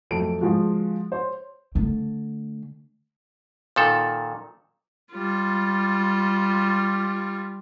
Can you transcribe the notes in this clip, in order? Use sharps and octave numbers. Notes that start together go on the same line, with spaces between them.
F2 F#3 A3 A5 D7
F3 G#3 F4 F#4
C5 C#5
D3 A3
A#2 D#3 A4
G3 F4